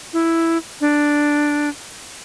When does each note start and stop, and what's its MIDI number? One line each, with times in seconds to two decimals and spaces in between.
0.13 0.57 64
0.81 1.69 62